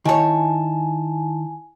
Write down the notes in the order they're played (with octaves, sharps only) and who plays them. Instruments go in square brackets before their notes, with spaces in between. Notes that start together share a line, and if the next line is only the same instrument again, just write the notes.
[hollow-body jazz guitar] D#3 C#5 [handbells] E4 A5 [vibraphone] G#5